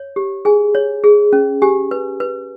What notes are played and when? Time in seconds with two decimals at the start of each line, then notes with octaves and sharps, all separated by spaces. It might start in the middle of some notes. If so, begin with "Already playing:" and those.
Already playing: C#5
0.16 G4
0.45 G#4 G#5
0.75 C#5
1.04 G#4
1.33 C#4
1.62 G4 G#5
1.91 B4
2.20 B4